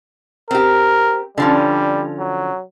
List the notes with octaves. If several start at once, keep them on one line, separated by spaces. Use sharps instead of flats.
C4 G4 A#4
D3 F3 G3 C#4
F#3